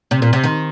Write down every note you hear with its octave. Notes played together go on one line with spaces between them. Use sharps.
C3
A#2
C3
D#3